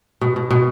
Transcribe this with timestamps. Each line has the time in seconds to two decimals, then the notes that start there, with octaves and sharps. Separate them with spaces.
0.21 B2
0.36 B2
0.51 B2